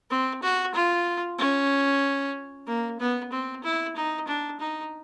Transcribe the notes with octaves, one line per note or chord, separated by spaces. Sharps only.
C4
F#4
F4
C#4
A#3
B3
C4
E4
D#4
D4
D#4